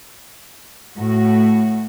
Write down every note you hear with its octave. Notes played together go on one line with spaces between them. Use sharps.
A2 A3 F#4